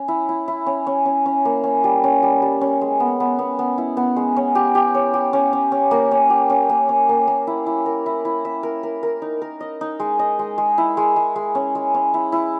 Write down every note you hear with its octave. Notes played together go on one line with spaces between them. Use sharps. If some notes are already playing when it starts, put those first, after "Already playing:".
Already playing: C#4
E4
E4
E4
C#4
C#4
C#4
C#4
A#3
C#4
G3
C#4
G3
G3
C#4
G#3
B3
B3
B3
B3
E4
B3
G#3
C#4
G4
G4
C#5
G4
C#4
C#4
C#4
A#3
C#4
G4
C#4
A#3
C#4
A#3
A#3
E4
E4
A#4
E4
E4
E5
A#4
A#4
A#4
D#4
A#4
D#5
D#4
G#3
D#5
G#3
G#3
E4
G#3
G#3
G#3
C#4
G#3
C#4
E4
E4